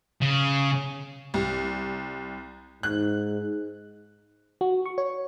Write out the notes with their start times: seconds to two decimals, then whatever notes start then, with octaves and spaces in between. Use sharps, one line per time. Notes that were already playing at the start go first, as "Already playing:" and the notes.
0.22 C#3
1.34 C2
2.83 G#2 F#6
4.61 F#4
4.86 C#6
4.98 C#5